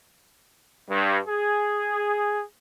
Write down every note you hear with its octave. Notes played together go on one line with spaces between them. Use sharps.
G2
G#4